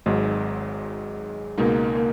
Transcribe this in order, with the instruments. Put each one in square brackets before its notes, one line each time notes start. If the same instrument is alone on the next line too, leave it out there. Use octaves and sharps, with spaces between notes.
[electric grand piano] G#1 G#2 F#3 [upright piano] G#3
[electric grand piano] C#2 B2 G#3 D#4 [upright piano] A#3
[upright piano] A#3